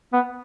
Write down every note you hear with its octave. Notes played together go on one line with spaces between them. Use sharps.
B3